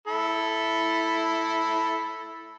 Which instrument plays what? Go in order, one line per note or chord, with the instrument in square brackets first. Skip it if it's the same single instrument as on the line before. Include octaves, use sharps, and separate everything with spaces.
[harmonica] E4 A4 B5